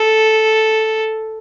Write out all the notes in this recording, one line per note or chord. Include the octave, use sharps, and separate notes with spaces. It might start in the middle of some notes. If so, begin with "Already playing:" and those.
Already playing: A4